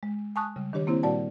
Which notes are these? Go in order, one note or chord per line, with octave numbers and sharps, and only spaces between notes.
G#3
G#5 A5 C#6 D#6 F#6
C#3 G3
D#3 D4 G4 C#5
A#3 C4 E4 C5
A#2 G3 F#4 D5 F#5 A5